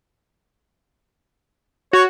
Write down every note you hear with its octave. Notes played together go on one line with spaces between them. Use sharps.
F#4 C#5